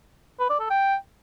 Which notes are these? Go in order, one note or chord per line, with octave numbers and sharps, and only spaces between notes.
B4
D5
A4
G5